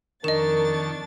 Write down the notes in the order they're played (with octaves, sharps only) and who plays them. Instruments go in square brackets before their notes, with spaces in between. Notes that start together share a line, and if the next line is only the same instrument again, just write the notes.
[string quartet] F2 D4 A6 [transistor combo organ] D#3 C#6 [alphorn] A#4 [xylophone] D#5 E7